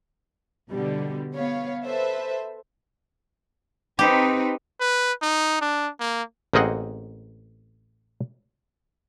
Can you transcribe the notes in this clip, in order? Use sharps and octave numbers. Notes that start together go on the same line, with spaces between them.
B2 D3 G3
B3 C#5 F5
A4 B4 C5 E5
C4 D#4 G4 B4
B4
D#4
D4
A#3
A1 A#3 C4 G#4 D#5 F#5